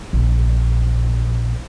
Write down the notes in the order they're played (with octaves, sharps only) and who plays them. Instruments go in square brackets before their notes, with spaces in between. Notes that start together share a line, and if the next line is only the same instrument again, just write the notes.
[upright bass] A#1 A#2